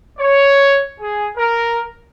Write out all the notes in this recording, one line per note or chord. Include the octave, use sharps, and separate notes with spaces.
C#5
G#4
A#4